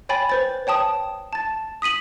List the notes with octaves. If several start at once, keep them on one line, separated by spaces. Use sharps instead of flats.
C#5 G5 G#5 B5 A6
B4 C5 A6
C#5 G5 A5 D#6
A5 A6
D#6 B6 D#7 F#7